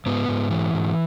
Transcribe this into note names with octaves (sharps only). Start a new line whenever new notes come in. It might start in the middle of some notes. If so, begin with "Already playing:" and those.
G#2 B3
G#2
E3
G#2